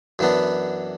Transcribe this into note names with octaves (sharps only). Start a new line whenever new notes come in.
F#2 E3 B3 D4